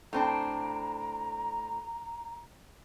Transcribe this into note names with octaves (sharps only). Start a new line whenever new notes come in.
A2 C4 D4 A#5